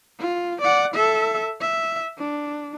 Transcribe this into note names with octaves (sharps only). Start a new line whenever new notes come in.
F4
D5 F#5
A4 E5
E5
D4